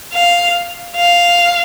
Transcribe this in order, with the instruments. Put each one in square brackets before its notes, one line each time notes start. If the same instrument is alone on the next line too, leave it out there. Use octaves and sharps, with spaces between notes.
[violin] F5
F5